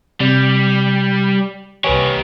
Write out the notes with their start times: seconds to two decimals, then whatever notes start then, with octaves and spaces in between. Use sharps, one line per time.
0.20 C3 G3
1.84 C2 G4 B4 C#5 G#5